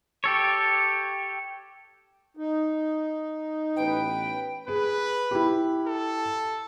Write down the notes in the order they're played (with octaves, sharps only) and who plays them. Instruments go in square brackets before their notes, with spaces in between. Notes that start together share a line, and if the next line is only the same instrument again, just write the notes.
[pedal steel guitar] G4 A4 C#5
[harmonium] D#4
[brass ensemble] A1 B3 B4 [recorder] G5
[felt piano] G#4 [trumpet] B4
[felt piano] E4 G4
[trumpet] A4